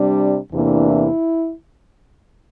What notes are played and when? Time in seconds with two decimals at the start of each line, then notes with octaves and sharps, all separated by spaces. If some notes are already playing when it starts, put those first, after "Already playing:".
Already playing: C3 G3 D4
0.52 E2 C3 E3 A#3 D4
0.86 E4